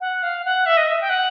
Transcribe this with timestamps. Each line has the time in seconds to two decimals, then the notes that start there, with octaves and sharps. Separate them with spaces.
0.01 F#5
0.23 F5
0.45 F#5
0.66 E5
0.77 D#5
0.88 E5
1.01 G5
1.10 F#5